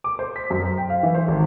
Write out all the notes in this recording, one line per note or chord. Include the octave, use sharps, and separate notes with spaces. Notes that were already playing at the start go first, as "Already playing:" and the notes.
D6
C5
B6
F#2
C5
G5
F5
E3
C5
G#1